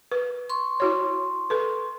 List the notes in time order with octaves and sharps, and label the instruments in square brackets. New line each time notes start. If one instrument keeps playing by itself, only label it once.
[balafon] B4
[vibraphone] C6 C#6
[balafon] E4 F#4 C#5
A4 B4